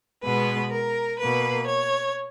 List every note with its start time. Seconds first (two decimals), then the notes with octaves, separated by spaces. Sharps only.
0.23 B2 G#3 B3 B4
0.72 A#4
1.20 B2 A#3 B4
1.67 C#5